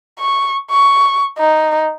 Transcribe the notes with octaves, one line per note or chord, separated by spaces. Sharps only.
C#6
C#6
D#4